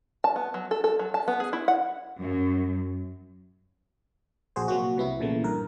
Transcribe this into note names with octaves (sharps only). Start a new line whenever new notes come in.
A5
B3
F#3
A4
A4
F#3
A5
B3
G#4
E4
F#5
F#2
A#1 F#4 G#4 C5
C3 F#3 A#3 F#4
C2 C3 B3 E4
A#1 A#2 C#3 E3 A3
G2 A#4